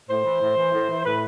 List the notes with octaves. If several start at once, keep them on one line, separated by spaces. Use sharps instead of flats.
A2 C5
E3
A2
E3
A2
E3
A2 B4